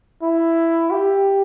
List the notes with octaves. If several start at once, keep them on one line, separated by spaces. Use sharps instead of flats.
E4
G4